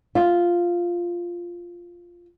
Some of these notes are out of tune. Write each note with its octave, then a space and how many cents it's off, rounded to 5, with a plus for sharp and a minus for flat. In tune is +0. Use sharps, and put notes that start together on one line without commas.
F4 +0 E5 +0